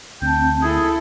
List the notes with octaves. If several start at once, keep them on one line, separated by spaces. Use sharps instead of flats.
D2 C4 G5 A5
E4 G#4 A4 D#6